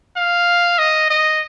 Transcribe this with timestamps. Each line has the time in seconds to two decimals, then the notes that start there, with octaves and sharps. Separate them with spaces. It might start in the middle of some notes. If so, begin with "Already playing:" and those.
0.16 F5
0.78 D#5
1.10 D#5